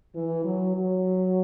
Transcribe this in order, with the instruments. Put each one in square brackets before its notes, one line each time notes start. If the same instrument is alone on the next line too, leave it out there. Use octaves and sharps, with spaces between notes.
[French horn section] E3
F#3
F#3